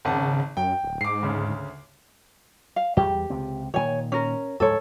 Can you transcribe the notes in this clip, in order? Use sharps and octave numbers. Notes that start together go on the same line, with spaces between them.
G#1 C#3 F#5 A5
F#2 G5
D1
G#2 D6 C7
D2 C#3
F5
E2 G3 G4
C#2 C3 C4
A#2 D#3 C#5 G#5
C#4 A#4
D2 G#2 F3 A4 C#5